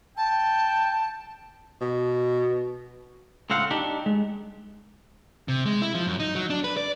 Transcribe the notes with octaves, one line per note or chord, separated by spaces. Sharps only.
G5 A5
B2
C#2 A2 C4 F5 F#5
D4 D#4 G4
G#3
C3
G#3
E4
F3
F#2
D#4
F#3
D4
B4
D5